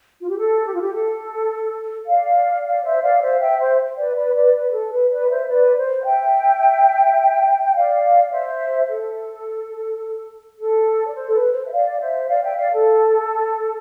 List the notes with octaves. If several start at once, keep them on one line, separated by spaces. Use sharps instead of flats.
F4
G4
A4
G4
F4
G4
A4
D5 F5
D5 F5
C5 E5
D5 F5
C5 E5
E5 G5
C5 E5
B4 D5
B4 D5
B4 D5
B4
A4
B4
B4 D5
C5 E5
B4 D5
C5
E5 G5
G5
D5 F5
C5 E5
A4
A4
D5
C5
A4
B4
C5
E5
D5 F5
C5 E5
D5 F5
E5 G5
D5 F5
A4